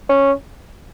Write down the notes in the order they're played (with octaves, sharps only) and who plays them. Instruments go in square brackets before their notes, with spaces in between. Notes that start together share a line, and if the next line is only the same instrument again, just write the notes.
[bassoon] C#4